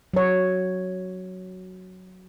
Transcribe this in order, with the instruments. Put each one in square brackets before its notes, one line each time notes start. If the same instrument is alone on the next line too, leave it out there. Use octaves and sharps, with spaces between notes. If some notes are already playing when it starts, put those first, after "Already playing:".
[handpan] F#3 C#5